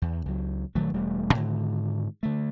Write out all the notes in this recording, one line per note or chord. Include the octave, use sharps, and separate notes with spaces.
E2
C#2 F#3
A#1 D#3 F#3 A3
E1 G3 A3
G#2 D3 D#3
D3 A3